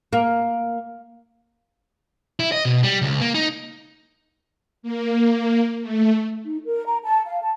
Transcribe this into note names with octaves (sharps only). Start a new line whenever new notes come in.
A#3
E4
D#5
B2
G3
C#2
A#3
D#4
A#3
A3
D#4
A#4
A#5
A5
F5
A5